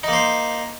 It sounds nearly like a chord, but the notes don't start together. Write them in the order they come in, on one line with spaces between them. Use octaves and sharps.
D#4 A#3 C5